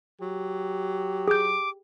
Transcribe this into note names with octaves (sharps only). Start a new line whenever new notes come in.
F#3 G4
G#4 D6 G6